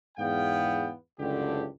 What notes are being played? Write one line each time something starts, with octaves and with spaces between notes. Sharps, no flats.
E2 G#2 B3 F5 G5
F#1 C#2 G2 D3 G4